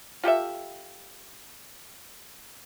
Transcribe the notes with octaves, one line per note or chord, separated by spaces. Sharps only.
F4 G4 A4 E5